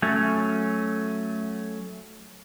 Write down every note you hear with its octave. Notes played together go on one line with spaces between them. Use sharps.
F#3 A3 C#4